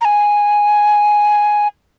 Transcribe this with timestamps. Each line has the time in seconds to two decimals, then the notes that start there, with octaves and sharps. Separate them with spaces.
0.01 A#5
0.05 G#5